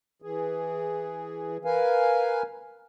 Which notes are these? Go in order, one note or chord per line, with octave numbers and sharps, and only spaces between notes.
E3 G#4
A#4 B4 F5 G#5